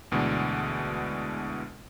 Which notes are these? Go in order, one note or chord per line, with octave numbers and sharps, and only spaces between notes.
D2 B2 E3 G#3 B3 D4